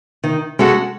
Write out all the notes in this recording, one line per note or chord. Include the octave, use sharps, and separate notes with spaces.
D#3
G#3 C#4 F#4 A4